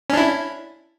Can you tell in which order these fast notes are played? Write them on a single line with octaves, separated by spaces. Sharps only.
C#4 D4 E4